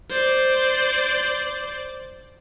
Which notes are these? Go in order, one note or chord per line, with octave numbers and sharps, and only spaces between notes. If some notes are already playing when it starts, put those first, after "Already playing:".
C5 D5